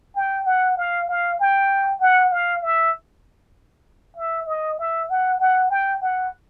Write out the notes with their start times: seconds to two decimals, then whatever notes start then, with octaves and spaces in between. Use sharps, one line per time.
0.16 G5
0.46 F#5
0.78 F5
1.09 F5
1.40 G5
2.01 F#5
2.32 F5
2.63 E5
4.16 E5
4.47 D#5
4.79 E5
5.10 F#5
5.40 F#5
5.70 G5
6.02 F#5